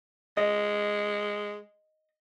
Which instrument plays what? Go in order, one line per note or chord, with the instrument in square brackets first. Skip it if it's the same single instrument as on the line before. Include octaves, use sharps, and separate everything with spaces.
[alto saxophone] G#3 [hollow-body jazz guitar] D#5